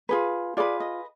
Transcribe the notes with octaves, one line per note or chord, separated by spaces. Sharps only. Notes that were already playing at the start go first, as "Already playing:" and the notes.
F4 G#4 B4
F4 G#4 B4 D5
D#5